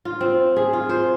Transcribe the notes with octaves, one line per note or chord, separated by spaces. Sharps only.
F4
C4
G#4
F4
C5